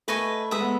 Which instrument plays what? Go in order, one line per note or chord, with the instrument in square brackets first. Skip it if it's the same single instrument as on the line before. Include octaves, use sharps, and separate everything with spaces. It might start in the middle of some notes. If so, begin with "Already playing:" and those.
[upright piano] A3 [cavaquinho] B4 D#5 G#5 C#6
[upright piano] G#3 [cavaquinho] B4 E5 B5 D#6
[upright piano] B3